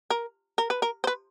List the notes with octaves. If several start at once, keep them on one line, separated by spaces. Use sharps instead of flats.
A#4
A#4
B4
A#4
C5
B4